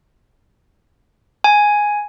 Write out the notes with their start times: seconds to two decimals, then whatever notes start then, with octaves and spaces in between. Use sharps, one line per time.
1.44 G#5